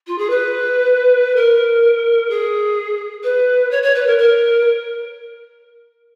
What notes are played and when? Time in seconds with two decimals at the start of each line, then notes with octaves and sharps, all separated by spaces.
0.07 F4
0.18 G#4
0.30 B4
1.36 A#4
2.30 G#4
3.24 B4
3.71 C#5
3.83 C#5
3.95 B4
4.07 A#4
4.18 A#4